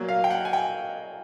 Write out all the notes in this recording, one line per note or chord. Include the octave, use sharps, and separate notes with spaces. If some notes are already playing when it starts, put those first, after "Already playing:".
Already playing: A#2 F#3 A#3
F5
G5
F#5
G#5
G5